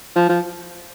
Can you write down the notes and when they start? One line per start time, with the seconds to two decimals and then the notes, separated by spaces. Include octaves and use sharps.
0.16 F3
0.29 F3